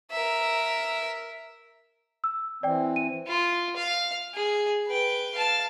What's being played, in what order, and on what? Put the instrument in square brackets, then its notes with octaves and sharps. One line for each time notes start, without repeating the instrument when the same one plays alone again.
[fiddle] A#4 E5
[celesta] E6
[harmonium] E3 C4 [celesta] D5 G5
[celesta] D#7
[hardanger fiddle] F4
F5
G#4
B4 G5
F5 A5